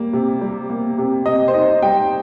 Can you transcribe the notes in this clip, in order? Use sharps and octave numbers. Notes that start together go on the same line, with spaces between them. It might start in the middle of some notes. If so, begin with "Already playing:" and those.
Already playing: G3 A#3
C3
G3
A#3
C3
C3 D#5
C5
D#4 D#5
G3 G5